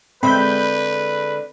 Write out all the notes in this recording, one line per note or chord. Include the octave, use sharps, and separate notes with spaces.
D3 G#3 C4 B4 E5 B5 G6